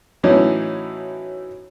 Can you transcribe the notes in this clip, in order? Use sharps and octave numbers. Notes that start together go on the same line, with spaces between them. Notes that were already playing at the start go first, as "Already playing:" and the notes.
A2 E3 F#3 C#4 D#4